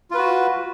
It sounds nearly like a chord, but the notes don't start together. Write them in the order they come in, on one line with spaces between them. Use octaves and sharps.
F4 B4 F#4